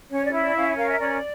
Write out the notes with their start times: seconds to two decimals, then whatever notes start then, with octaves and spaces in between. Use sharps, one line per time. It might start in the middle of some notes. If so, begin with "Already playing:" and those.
0.11 C#4 C#5
0.25 D5
0.33 E4
0.40 D5
0.55 C#4 F5
0.66 E5
0.77 A#4 F5
0.88 E5
0.99 C#4 D5